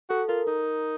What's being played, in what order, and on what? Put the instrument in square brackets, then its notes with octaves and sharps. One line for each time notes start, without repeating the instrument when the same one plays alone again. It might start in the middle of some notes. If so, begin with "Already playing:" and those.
[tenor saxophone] F#4 [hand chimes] A4
[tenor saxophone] F4 [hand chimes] A#4
[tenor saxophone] D#4 [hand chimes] A#4